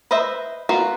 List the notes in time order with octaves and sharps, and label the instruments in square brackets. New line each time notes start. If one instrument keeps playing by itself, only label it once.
[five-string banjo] B4 C5 D#5 E5
B3 F4 F#4 A#4 B4